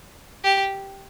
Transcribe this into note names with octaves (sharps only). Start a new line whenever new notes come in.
G4